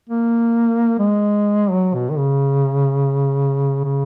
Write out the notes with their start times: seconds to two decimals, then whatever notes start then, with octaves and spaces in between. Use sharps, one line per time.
0.10 A#3
0.99 G#3
1.70 F#3
1.94 B2
2.10 D#3
2.18 C#3
3.85 C#3